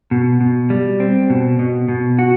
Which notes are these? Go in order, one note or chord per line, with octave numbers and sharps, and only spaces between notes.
B2
B2
G3
C4
B2
B2
B2
F#4